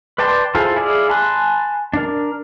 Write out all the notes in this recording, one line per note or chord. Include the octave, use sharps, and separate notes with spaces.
B4 D5 G5 A5 C6
E4 F4 G#4 A4 C5
E4 G#4 D5 F5
G#5 A5 B5 C6 F#6
D4 A#4